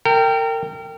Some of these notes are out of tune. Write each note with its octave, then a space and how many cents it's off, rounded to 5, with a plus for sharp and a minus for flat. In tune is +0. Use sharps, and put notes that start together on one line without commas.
A#4 -35 G5 +0